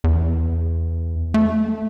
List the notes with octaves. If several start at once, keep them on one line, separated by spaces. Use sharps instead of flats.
E2
A3